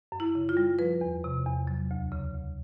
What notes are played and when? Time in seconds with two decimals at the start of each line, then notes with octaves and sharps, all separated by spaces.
0.12 F#2
0.20 E4
0.35 C#3
0.49 F4
0.57 G3
0.79 F3 B4
1.01 E2
1.24 C3
1.46 E2
1.67 F#3
1.91 D2
2.12 C#3
2.34 D2